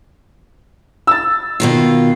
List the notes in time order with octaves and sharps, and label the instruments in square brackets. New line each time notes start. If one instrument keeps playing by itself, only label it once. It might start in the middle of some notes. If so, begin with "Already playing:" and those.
[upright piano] E6 A6
[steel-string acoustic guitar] B2 D#3 F4